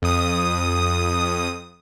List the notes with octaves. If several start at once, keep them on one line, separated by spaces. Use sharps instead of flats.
F2 D#6